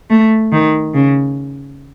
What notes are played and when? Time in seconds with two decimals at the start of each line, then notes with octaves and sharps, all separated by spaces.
0.10 A3
0.52 D#3
0.94 C#3